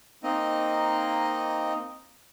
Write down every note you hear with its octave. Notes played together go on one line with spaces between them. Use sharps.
A#3 C4 D#4 D#5